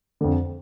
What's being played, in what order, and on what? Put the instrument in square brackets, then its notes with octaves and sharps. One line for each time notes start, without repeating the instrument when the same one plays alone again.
[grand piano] F2 D3